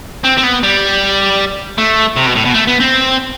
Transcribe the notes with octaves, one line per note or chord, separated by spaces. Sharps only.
C4
C4
B3
G3
A3
C3
B2
A2
B2
A3
B3
C4